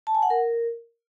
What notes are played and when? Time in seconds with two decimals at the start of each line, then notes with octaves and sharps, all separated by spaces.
0.07 A5
0.15 G#5
0.22 F#5
0.30 A#4